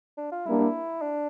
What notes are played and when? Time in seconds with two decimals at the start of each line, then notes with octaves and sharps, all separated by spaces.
0.17 D4
0.32 F4
0.46 G3 A#3 D4 E4
1.02 D4